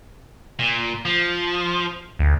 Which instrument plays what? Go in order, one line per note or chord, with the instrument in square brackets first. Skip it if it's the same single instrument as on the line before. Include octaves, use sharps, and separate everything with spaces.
[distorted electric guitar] A#2
F3
[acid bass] D2